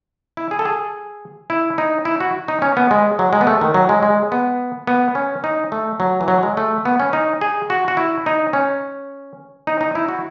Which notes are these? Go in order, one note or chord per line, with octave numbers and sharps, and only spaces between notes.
E4
G#4
A4
G#4
E4
D#4
E4
F#4
D#4
C#4
B3
G#3
F#3
G#3
B3
A3
D#3
F#3
G#3
G#3
B3
B3
C#4
D#4
A3
F#3
E3
F#3
G#3
A3
B3
C#4
D#4
G#4
F#4
F#4
E4
D#4
C#4
D#4
D#4
E4
F#4